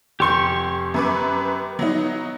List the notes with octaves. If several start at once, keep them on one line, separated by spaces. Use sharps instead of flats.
F1 G4 C6 C#6 G6
F#2 B4 D6
F#3 B3 D#4